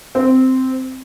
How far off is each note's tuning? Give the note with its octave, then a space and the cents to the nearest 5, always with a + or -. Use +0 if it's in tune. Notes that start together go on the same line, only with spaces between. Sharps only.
C4 -10